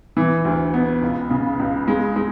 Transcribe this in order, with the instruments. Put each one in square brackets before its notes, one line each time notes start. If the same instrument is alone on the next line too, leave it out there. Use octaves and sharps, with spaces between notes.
[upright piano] E3
D2
B3
C#2
C#3
C#2
G#3
G#3